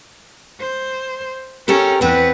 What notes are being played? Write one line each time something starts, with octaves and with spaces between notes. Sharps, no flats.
C5
C#4 G4 A4 A#4
E2 B3 C4 B4